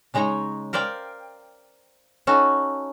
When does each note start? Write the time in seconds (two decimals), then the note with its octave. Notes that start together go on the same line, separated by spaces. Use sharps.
0.14 C#3 G#3 D#4 C#5 A#5
0.73 A#4 C5 D5 F5 G5
2.27 C#4 D#4 F#4 A4 C#5